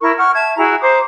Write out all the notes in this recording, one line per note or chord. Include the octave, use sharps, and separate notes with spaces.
E4 A#4 C#6
F#5 C#6 F6
E5 A5 G#6
E4 F#4 G#4 A#5
C5 A#5 D6 D#6